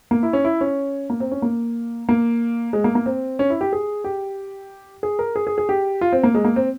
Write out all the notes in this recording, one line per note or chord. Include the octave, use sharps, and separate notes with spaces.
A#3
E4
C#4
E4
C#4
A#3
C4
C#4
A#3
A#3
G#3
A#3
A#3
C4
C#4
E4
G4
G#4
G4
G#4
A#4
G#4
G#4
G#4
G4
F4
C4
A#3
G#3
A#3
C4